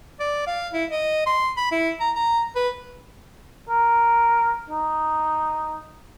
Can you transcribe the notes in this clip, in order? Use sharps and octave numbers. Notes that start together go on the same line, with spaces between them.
D5
F5
E4
D#5
C6
B5
E4
A#5
A#5
B4
A#4
D#4